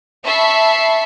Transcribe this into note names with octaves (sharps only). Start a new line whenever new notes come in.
E5 A5 B5 C#6 C7